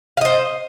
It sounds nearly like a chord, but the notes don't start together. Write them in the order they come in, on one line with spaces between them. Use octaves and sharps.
F5 D#5 C5